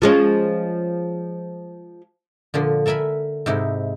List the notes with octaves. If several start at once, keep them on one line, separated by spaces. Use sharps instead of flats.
F3 G#3 C#4
A#2 D3 F3
A4 A#4 E5 G#5 B5
G#2 C3 D#4 E4